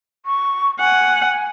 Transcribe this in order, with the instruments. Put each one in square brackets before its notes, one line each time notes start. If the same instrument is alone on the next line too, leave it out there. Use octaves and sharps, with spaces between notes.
[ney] C#6
[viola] F#5 [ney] G#5